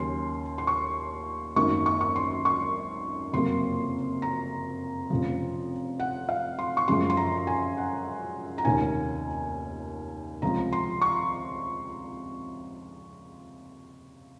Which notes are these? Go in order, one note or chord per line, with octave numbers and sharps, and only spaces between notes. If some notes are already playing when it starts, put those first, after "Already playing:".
Already playing: D#2 C#3 F#3 C#4 C6
C6
C#6
G#1 F#2 D#3 F#3 A#3 C#6
C#6
C#6
C6
C#6
F#1 F2 C3 F#3 A#3 C6
A#5
F1 F2 C#3 F3
F#5
F5
C6
C#6
F#2 C#3 F3 G#3 C6
C6
A#5
G#5
F#5
A#5
F1 D#2 D#3 A#3 C#4 G#5
C#2 C3 F3 A#5
C6
C#6